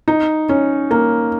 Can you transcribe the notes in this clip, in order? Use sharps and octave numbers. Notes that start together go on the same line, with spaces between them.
D#4
C#4
A#3